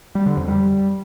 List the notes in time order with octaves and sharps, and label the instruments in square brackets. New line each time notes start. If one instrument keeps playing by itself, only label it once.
[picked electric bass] G3
D3
F2
G3